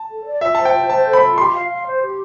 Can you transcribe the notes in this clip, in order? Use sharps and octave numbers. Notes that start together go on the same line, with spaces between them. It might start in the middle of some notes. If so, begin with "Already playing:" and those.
Already playing: A5
A4
D5
F4 E5
C5 A5
G5
C5
C5 A5
A4
B5
F4
G4 C6
F5
F5
C5
G4